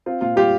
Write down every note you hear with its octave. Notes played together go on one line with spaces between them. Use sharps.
C4 F4
A#2 F4
G3 F4 G4